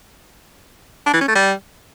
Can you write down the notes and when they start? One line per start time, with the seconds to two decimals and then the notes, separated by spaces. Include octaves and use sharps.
1.06 D4
1.14 E3
1.21 C#4
1.28 A3
1.35 G3